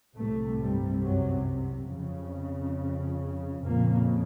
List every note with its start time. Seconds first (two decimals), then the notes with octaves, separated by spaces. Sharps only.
0.16 C2 A2 C3 A3
0.59 G2 G3
1.02 F#2 F#3
1.90 F2 C#3
3.63 F2 A#2 C#3 A#3